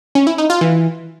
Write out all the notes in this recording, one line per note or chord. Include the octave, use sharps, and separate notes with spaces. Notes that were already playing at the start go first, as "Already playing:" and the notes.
C#4
E4
D#4
F4
E3